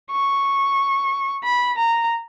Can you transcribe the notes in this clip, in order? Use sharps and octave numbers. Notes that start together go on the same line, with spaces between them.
C#6
B5
A#5